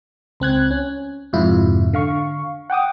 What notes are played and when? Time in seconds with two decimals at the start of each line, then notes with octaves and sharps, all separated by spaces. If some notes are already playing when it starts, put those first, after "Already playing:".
0.40 C#2 C4 F#6 G#6
0.71 C#4
1.33 F2 G#2 C3 E4 F4
1.93 D3 F5 C#6
2.70 F#5 G5 D6 D#6